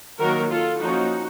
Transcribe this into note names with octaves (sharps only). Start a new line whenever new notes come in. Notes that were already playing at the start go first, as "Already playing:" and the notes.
D#3 F#3 A#3 F#4 A#4
F4 A4
F3 A#3 C#4 D#4 F#4